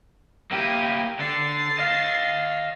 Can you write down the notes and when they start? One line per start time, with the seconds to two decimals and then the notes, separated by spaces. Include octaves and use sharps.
0.51 A#3 E4 G4 D#7
1.19 D3 A6 C7
1.79 D#5 F5